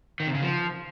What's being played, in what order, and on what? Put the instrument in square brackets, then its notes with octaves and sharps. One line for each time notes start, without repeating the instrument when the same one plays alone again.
[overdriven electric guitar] D#3
C3
C#3
F3